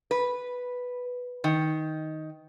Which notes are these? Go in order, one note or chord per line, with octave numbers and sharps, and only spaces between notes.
B4
D#3